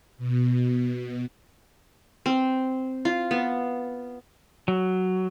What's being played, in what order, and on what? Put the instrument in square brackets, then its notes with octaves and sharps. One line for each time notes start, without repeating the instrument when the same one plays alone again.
[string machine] B2
[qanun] C4
F4
B3
[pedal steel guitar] F#3